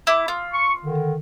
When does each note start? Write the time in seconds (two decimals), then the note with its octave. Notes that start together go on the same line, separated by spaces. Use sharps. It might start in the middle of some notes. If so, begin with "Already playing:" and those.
0.07 E4 D6
0.28 F4
0.53 C#6
0.82 D3 D#3